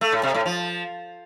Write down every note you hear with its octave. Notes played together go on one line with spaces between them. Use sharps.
A3
A2
C3
A2
F3